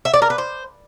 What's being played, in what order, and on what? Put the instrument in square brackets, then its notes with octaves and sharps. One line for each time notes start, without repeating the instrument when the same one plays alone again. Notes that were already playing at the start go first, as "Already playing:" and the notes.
[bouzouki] E5
D5
A#4
B4
C5